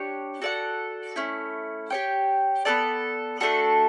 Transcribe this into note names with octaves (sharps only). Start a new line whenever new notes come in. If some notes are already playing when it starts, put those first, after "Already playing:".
Already playing: D4 G4 C#5
F#4 A4 D5 F#5
A3 C#4 E4
G4 C#5 G5
B3 F#4 A4 D5
A3 D4 F#4 A4